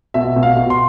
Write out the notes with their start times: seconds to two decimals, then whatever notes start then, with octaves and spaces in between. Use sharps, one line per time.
0.14 B2 E5
0.36 B2
0.43 F5
0.57 B2
0.70 C6